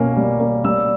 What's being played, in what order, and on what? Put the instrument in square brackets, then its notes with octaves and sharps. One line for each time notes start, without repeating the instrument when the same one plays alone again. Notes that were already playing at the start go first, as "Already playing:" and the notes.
Already playing: [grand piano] B2 A#3 C#4
G3
A#3
G3 E6